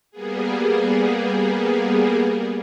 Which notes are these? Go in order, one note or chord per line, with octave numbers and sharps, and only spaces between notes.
G3 A#3 B3 G#4